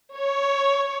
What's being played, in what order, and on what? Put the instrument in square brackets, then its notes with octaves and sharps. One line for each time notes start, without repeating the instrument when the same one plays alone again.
[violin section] C#5